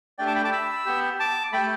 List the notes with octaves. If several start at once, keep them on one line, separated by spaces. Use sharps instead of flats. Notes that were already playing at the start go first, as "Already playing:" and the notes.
A3 D4 G4 D5 G5
A5 D6
G5 B5
A5 D6
B5 E6
B3 G4
A5 D6
A3 G4 G5 B5